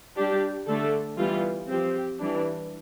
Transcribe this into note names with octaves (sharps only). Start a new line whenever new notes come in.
G3 D4 G4
D3 A3 D4 A4
E3 G3 B3 F4
F3 C4 G4
E3 G3 D4